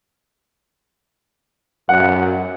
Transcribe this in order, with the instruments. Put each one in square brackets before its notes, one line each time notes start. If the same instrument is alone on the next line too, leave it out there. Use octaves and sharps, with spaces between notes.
[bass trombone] F#2 [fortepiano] F#5